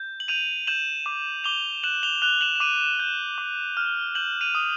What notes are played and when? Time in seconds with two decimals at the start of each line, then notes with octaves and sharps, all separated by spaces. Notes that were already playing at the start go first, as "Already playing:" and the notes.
Already playing: G6
0.20 F#7
0.28 G6 D#7 F7
0.67 G6 E7 F#7
1.06 D6
1.44 D6 F7 G7
1.83 F#6 E7 F#7
2.03 F7 G7
2.22 F#6 F7 G7
2.41 E7 F#7
2.56 E7
2.60 D6 D#7 F7
2.99 G6
3.38 D6
3.77 F6
4.15 G6 E7 F#7
4.41 D#7 F7
4.55 D#6